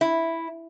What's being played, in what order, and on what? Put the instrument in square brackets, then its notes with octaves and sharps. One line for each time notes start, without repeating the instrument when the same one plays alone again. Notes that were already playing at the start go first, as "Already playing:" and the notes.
[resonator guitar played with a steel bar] E4